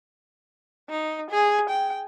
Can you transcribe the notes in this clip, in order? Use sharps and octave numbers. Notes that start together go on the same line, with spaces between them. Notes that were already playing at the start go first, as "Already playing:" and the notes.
D#4
G#4
G5